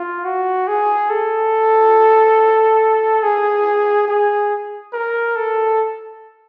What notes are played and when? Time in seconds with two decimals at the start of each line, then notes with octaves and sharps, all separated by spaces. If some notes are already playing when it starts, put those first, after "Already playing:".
Already playing: F4
0.25 F#4
0.68 G#4
1.10 A4
3.23 G#4
4.08 G#4
4.93 A#4
5.36 A4